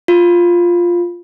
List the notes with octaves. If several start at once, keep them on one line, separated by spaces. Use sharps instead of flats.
F4